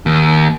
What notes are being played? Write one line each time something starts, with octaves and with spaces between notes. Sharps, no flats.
D#2